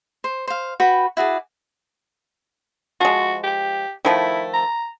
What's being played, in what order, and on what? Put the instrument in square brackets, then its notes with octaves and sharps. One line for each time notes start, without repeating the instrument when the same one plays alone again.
[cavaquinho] C5
C5 F5
F#4 B4 G5 B5
E4 F#4 G#4 D5
[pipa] F3 G#3 [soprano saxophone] F#4
[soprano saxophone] G4
[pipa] D#3 F3 A3 [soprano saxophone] E4
[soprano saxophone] A#5